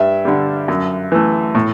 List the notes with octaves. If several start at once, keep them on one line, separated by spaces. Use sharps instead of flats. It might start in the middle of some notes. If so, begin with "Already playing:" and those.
Already playing: G2 E5
D3 G3
F#2
E3 A3
A2